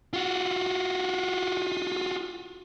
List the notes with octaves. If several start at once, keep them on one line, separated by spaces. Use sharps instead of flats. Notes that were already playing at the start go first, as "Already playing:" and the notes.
F4 F#4